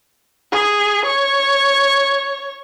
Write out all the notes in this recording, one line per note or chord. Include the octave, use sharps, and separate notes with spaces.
G#4
C#5